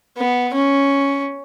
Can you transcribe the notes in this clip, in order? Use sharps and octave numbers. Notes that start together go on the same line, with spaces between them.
B3
C#4